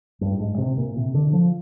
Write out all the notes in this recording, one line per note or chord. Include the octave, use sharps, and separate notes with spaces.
G2
G#2
C3
A#2
C3
D3
F3